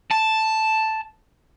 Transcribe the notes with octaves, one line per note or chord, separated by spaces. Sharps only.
A5